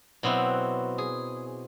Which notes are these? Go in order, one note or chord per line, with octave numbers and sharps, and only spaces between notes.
B2 F#3 C4 E4
G#4